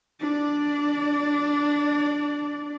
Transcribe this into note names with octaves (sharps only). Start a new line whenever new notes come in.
D4 D5